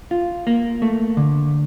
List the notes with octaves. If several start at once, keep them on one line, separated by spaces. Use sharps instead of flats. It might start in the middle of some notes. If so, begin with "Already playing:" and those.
F4
A#3
A3
D3